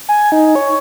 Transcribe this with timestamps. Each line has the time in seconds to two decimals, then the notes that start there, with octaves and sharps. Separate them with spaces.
0.09 G#5
0.32 D#4
0.55 C#5